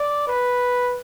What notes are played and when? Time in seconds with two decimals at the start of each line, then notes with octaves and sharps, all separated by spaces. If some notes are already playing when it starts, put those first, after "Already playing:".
Already playing: D5
0.27 B4